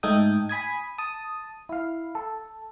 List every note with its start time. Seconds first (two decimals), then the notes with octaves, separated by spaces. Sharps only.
0.03 G#2 A3 D#4 A4 G5 D#6
0.49 G#5 B5 D#6 G#6
0.98 A5 D#6
1.69 E4 F5
2.15 A4